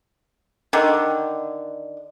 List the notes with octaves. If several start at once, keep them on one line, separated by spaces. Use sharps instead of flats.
D3 D#3